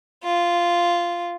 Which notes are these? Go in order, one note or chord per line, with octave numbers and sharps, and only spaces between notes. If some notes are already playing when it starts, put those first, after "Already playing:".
F4